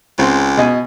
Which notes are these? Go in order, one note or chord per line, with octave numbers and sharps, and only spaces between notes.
C#2 C4 C6
B2 D#5 G#5